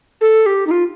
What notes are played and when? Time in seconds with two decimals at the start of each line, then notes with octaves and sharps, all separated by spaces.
0.21 A4
0.46 G4
0.67 D#4
0.71 F4